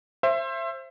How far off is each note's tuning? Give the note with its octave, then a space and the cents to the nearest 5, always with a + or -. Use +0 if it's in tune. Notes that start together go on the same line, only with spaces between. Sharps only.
C5 +20 E5 +25